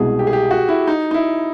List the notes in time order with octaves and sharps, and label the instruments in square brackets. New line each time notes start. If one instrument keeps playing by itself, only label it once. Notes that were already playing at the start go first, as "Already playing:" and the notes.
Already playing: [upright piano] C2 B2 G#3 [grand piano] G#4
[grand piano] G4
G#4
G4
F#4
E4
D#4
D#4
E4